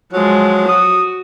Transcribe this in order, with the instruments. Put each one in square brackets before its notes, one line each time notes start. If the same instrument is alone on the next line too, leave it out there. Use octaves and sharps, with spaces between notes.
[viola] F3 G#3 [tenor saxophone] F#3
[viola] F#4 [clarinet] D#6